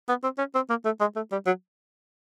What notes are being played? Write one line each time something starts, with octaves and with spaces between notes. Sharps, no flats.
B3
C4
C#4
C4
A#3
A3
G#3
A3
G3
F#3